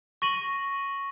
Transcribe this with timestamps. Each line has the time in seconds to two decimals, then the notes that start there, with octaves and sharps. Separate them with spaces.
0.22 C#6 A#6 D#7 F#7